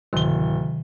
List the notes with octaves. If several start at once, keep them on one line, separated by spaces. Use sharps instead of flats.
D1 C3 D#3 C6 G7